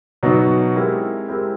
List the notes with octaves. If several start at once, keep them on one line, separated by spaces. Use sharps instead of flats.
B2 F#3 B3 D#4 F#4
G#3 C4 E4 G4 A#4
G#3 C4 E4 G4 A#4